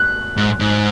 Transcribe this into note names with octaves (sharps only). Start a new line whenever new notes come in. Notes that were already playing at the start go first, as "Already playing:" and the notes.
Already playing: F#6
G#2
G#2